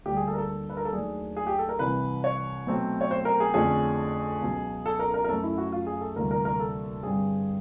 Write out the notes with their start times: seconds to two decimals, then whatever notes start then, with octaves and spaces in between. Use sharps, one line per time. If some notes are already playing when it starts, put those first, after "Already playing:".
0.06 D2 D3 G3 A#3 D4 G4
0.17 G#4
0.27 A4
0.33 A#4
0.38 A4
0.70 B4
0.77 A#4
0.85 A4
0.93 D#2 D#3 F#3 A3 D4 G#4
1.37 G#4
1.47 G4
1.59 A4
1.69 A#4
1.79 C2 C3 E3 B4
2.24 C#5
2.67 B2 F#3 A3 C4
3.01 C#5
3.11 C5
3.25 A#4
3.40 G#4
3.54 F2 D3 F3 A3 C#4 G#4
4.41 C#2 B2 F#3
4.86 A4
4.99 A#4
5.14 A#4
5.24 A#4
5.28 F#2 C#3 F#3 A3 C#4 A4
5.43 E4
5.58 F#4
5.72 F4
5.87 G#4
6.01 A4
6.16 D2 C3 E3 G3 A#3 A#4
6.31 A#4
6.45 A#4
6.60 A4
7.03 G2 D3 G3 C4 G#4